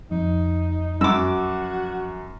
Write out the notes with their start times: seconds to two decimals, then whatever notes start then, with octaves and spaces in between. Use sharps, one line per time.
0.11 F2 D#4
1.01 F#2 F#4 D6 E6